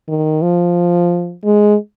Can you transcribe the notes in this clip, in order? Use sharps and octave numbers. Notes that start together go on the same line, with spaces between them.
D#3
F3
G#3